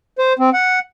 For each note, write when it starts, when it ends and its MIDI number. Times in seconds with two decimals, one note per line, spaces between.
0.18 0.33 72
0.39 0.50 60
0.53 0.79 78